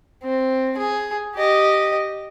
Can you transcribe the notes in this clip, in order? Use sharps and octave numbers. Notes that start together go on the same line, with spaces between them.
C4
G#4
G4 D#5